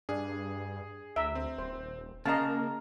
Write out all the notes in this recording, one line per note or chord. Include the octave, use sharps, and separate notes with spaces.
G2 D4 G#4
D2 E5 A#5
C4
D#1 C5
C#3 A#3 D#5 F5 A5 A#5 F6